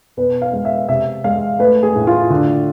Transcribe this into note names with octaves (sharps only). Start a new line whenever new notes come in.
B2 B4
F5
G#3
E5
C3 E5
G#3 F5
A3 B4
G#4
A2
F4
D3